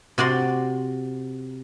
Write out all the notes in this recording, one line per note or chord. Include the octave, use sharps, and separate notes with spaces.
C3 F#4 D5 C6